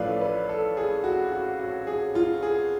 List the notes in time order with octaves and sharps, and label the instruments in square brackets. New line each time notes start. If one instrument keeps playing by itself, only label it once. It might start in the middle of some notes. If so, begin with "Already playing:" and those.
Already playing: [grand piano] A1 A2 F3 A4 B4 C#5 D5 F5
B4
A4
G#4
F#4
F#4
F#4
G#4
F4
G#4